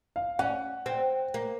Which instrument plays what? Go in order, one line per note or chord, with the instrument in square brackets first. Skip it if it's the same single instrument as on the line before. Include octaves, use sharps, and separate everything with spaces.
[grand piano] F5
[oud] C#4 [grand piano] F#5
[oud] C4
A#3